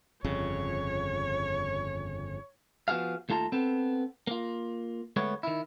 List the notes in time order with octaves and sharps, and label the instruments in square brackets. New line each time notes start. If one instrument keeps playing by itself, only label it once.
[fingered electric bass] G1 F2 C#3 [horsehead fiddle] C#5
[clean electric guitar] F3 B3 F#4 G#4 F5
D#2 A3 F4 A5 A#5
B3 C4 A4
A#3 F4
D2 G#3 A3 B3 C#5
D#3 E4